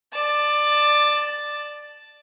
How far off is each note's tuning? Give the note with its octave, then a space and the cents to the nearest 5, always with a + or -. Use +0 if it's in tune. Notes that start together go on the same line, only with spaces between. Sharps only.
D5 +15 A5 +0